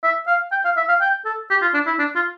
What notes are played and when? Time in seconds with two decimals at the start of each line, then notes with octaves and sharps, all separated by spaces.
0.04 E5
0.27 F5
0.52 G5
0.65 F5
0.77 E5
0.89 F5
1.01 G5
1.25 A4
1.50 G4
1.62 F4
1.74 D4
1.86 E4
1.99 D4
2.16 F4